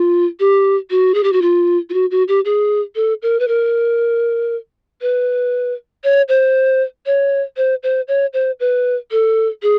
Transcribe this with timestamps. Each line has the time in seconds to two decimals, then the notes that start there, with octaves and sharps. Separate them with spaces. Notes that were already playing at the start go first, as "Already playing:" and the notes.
Already playing: F4
0.40 G4
0.91 F#4
1.14 G#4
1.23 G4
1.33 F#4
1.42 F4
1.90 F4
1.94 F#4
2.11 F#4
2.28 G4
2.45 G#4
2.96 A4
3.22 A#4
3.40 B4
3.48 A#4
5.02 B4
6.04 C#5
6.29 C5
7.06 C#5
7.57 C5
7.83 C5
8.08 C#5
8.33 C5
8.60 B4
9.12 A4
9.63 G#4